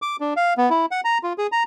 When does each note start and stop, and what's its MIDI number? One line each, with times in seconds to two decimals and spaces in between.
0.02 0.16 86
0.20 0.34 62
0.36 0.54 77
0.57 0.69 59
0.70 0.86 64
0.91 1.01 78
1.05 1.18 82
1.23 1.33 65
1.38 1.47 68
1.52 1.63 82